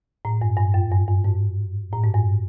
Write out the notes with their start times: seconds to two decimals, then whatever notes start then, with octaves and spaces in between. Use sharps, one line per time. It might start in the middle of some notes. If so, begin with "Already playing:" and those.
0.25 A2
0.42 G2
0.57 G2
0.74 F#2
0.91 G2
1.08 G2
1.24 G#2
1.93 A2
2.04 G#2
2.14 G2